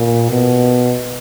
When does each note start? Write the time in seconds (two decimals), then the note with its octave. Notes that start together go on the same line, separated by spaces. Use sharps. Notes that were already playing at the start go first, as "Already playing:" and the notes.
Already playing: A#2
0.31 B2